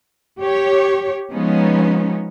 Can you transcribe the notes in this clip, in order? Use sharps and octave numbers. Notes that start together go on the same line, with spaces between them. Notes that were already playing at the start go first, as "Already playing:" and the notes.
G4 C#5
F3 G#3 B3 C#4 D#4